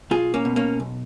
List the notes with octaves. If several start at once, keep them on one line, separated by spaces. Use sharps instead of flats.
B1 F4 G#4
A#3 C#4
B2
A#3 C#4
B1